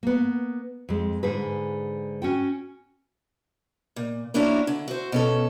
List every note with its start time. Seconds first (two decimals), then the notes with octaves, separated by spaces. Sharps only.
0.03 A#3 B3
0.89 F2 G#3
1.23 G#2 D3 G#4 B4
2.22 C#4 F#4 G5
3.96 A#2
4.34 A#3 C#4 D4 E4 F#4 A#4
4.67 D3
4.88 F#4 C5
5.12 B2 C#4 A4